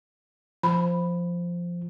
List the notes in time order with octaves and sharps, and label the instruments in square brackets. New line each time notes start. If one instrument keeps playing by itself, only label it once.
[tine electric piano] F3 [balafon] B5